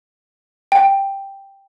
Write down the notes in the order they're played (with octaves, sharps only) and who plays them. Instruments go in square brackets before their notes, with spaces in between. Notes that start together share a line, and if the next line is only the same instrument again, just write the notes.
[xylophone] G5